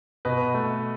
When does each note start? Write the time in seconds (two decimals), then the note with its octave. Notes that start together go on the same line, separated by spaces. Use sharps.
0.25 B2 B4 D#5
0.54 A3